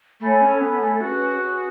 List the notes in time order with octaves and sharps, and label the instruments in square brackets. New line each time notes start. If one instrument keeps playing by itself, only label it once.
[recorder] A3 [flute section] A4 C#5 G#5 B5
[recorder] C#4
[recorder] B3 [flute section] A4 C#5 G#5 B5
[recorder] A3
[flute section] C#4 G#4 B4 [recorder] F#4
[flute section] C#4 G#4 B4